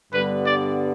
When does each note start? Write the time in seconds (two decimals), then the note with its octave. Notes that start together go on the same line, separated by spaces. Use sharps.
0.13 G2 D3 G3 B3 B4
0.45 D5